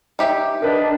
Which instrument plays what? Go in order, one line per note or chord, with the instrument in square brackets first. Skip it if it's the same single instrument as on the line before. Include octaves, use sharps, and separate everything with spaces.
[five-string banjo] D#4 G4 E5
[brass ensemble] D4 [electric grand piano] A#4 B4 D#5